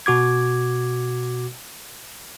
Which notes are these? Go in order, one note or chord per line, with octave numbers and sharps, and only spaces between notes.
B2 F#4 D6 G#6